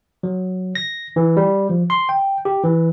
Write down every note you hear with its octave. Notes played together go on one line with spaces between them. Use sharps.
F#3
A#6
E3
G3
F3
C6
G5
G4
E3